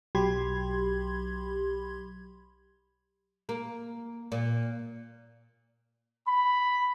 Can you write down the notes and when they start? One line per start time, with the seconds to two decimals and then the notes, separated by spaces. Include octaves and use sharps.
0.15 B1 F#3 G4 B5 C6 G#6
3.49 A#3
4.32 A#2
6.27 B5